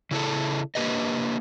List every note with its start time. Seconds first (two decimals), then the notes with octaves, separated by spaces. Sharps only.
0.11 C#3 E4 G#4 A4
0.75 A#3 D4 G4 B4 D#5